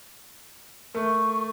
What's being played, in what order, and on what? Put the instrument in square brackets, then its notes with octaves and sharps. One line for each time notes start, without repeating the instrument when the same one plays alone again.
[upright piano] A3 [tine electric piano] A#4 [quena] C#6